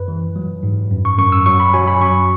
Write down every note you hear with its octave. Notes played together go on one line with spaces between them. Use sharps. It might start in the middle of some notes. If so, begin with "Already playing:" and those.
Already playing: F#2 B4
E3
F#3
G#2
F#2
C#6
F#2 C#6
E6
F#3 C#6
B5
F#3 G#5
B5
F#2 C#6